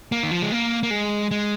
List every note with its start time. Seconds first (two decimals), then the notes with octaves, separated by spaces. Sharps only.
0.12 A#3
0.23 D#3
0.31 F3
0.42 G#3
0.52 A#3
0.83 A#3
0.91 G#3
1.31 G#3